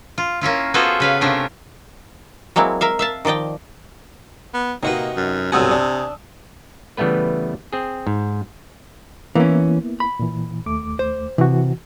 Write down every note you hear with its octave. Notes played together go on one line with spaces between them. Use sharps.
F4
A#3 C#4 E4 F4
B3 F4 F#4 G#4 A4 C5
C#3 B4 F5
C3 A3 C#4 D4 F4 A#4
F#3 G#3 A#3 C4 E4
A#4 E5 F5
E5 F5 A5
D#3 F3 D5 D#5 G5
B3
C3 A#3 D#4 F#4 B4
F#2
B1 G2 C3 F#4 G#5 D#6 E6
D4
C#3 E3 G3 A3 B3 B4
C4 G#4
G#2
E3 A#3 B3 C#4 E4
B5
A#2 E3
D#2 A3 D6
C5
C3 E3 F#4